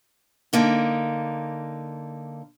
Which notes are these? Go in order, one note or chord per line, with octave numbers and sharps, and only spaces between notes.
D3 A#3 D#4